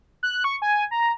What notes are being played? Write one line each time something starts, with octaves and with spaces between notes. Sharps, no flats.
F#6
C#6
G#5
A#5